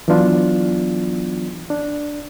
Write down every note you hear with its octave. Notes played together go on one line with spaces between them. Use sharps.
E3 F#3 B3 D4 F4
D4